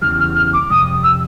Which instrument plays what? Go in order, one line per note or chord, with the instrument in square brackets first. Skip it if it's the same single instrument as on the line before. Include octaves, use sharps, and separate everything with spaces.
[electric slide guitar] E2 C#3 E3 G3 [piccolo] F6
[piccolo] F6
F6
D6
[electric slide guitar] F2 C3 G3 [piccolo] D#6
[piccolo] E6